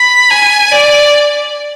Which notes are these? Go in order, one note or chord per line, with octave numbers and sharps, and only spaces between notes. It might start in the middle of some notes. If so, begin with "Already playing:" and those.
Already playing: B5
G#5
D5